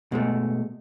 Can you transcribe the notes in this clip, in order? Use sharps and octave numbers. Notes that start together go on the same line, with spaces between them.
B2 G#3 A3